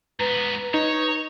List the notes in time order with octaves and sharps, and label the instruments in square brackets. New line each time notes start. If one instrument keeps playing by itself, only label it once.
[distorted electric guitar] G#2 B3 [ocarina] B4 [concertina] A#5
[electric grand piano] D#4 [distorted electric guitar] C#5